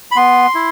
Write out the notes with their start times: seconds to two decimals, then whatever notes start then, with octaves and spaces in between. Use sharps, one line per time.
0.11 B5
0.16 B3 C6
0.55 E4